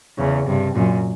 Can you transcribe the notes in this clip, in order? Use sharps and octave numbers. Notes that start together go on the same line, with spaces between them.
E2 C#3
G2 C3
F#2 A#2